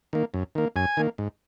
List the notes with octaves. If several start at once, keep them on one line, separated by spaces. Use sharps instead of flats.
D#3 A#3
F#2
D#3 A#3
F#2 G#5
D#3 A#3
G#2